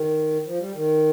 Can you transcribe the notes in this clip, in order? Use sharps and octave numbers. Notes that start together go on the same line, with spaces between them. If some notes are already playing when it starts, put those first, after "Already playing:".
Already playing: D#3
F3
G3
D#3